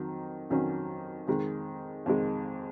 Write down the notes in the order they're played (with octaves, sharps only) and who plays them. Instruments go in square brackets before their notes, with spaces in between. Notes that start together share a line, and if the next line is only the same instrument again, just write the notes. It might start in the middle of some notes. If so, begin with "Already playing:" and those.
Already playing: [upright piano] F2 D#3 F#3
F2 D#3 F#3 C#4
F2 D#3 G#3
F2 D#3 G#3